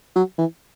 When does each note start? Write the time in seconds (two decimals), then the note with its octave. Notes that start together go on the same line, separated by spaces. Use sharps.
0.16 F#3
0.38 E3